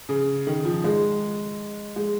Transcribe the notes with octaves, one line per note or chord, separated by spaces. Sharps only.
C#3
D#3
F3
G#3
G#3